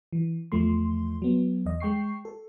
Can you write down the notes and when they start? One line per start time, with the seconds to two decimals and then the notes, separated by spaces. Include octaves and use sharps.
0.13 E3
0.52 E2 F3 A3 C6
1.22 F#3 B3
1.65 E2 D#5
1.80 G#3 G5 C#6 C7
2.25 A4